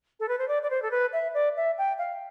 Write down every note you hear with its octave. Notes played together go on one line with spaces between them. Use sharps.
A4
B4
C5
D5
D5
C5
A4
B4
E5
D5
E5
G5
F5